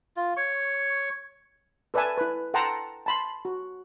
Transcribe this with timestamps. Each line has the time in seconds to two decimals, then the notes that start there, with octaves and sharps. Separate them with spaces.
0.16 F4
0.37 C#5 C#6
1.94 A4 B4 D5 E5 G#5 A5
2.18 E4 B4
2.54 A4 F#5 G5 A5 A#5 C6
3.06 A5 B5 C6
3.45 F#4